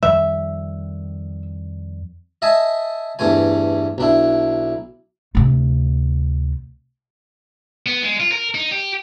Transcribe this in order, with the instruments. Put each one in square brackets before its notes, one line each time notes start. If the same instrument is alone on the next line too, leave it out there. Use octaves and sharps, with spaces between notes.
[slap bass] F2 D#3 G3 [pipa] E5
[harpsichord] D#5 E5 G#5 A5
E2 G2 A3 C5 G#5
B1 D4 E4
[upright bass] D2 C3
[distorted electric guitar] B3
G#3
F4
A#4
D#4
G4